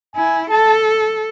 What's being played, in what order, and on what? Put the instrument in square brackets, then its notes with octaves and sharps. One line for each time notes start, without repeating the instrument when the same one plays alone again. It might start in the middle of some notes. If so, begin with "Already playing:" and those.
[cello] E4 [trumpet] G#5
[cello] A4 [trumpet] A5